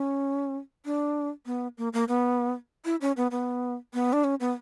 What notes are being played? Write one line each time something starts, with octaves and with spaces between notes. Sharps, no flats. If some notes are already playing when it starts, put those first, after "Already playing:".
Already playing: C#4
D4
B3
A#3
A#3
B3
E4
C#4
B3
B3
B3
D4
C#4
B3